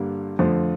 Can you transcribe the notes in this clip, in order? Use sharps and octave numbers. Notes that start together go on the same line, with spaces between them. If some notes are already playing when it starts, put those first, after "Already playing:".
Already playing: G2 D3 G3 A#3
F2 D3 F3 A3